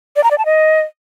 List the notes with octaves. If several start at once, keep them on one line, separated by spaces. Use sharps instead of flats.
D5
A#5
D5
A5
D#5